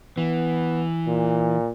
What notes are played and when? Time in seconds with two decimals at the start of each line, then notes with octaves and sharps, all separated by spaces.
0.18 E3 B3
1.07 A#2